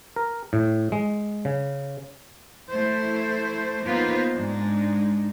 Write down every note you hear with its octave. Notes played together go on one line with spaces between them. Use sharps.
A#4
A2
G#3
C#3
A3 E4 C5
A#3 B3 D#4 F4 B4 C5
G#2 G#3 D4 D#4